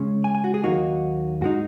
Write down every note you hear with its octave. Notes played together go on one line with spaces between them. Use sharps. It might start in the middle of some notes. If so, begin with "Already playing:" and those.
Already playing: C#3 G#3 C#4
G#5
G#5
F#4
G#4
D#2 D#3 F#3 A#3 D#4 F#4
G#2 G#3 D#4 F#4